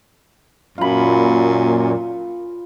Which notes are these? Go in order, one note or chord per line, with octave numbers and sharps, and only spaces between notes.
F#2 A#2 F4 B5